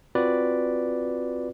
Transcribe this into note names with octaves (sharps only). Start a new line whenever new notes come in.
C4 F4 F#4 B4 D5